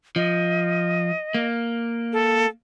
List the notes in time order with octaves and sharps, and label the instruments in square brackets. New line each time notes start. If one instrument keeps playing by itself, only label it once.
[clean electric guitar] F3 [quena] D#5
[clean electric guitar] A#3
[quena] A4